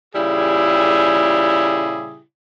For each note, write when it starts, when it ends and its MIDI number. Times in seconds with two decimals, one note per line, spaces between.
0.15 2.21 46
0.15 2.21 49
0.15 2.21 55
0.15 2.21 64
0.15 2.21 67
0.15 2.21 68